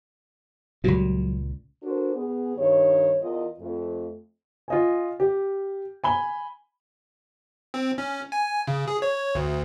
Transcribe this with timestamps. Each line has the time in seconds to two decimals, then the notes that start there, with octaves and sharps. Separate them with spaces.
0.84 C#2 A#2 F#3 G3
1.83 D4 F#4 A4 A#4 C5
2.15 B3 G#4
2.57 G2 D#3 B4 C#5
3.21 E2 F4 A#4 D#5
3.60 F2 A3
4.68 F4 D#5 G#5
5.20 G4
6.04 G#5 B5 G7
7.74 C4
7.98 C#4
8.32 G#5
8.67 C#3
8.88 G#4
9.02 C#5
9.35 D2